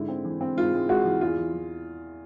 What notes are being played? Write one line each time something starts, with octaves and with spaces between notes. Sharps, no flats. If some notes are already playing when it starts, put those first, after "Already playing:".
Already playing: G#2 D3 E4
C4
E3
C4
G#2 F4
G#3
G#3 F#4
E3
E2 F4
E3
E3